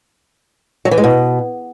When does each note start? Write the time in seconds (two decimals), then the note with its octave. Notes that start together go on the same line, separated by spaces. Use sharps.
0.85 F#3
0.91 E3
0.98 G#3
1.04 B2